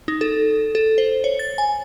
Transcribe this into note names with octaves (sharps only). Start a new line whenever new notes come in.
D#4
A4
A4
C5
C#5
A6
G#5